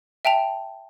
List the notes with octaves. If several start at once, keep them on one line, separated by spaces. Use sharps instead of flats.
E5 G5 A5 F7